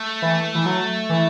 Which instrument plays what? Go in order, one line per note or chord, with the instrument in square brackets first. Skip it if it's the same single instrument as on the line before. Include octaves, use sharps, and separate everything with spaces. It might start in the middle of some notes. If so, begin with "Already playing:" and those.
Already playing: [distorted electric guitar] A3
[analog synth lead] E3
E3
F#3
E3